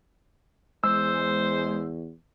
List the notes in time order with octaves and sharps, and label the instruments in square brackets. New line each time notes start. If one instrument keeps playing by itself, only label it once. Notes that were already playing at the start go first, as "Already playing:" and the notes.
[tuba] E2 [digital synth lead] G#3 [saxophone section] C5 [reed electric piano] E6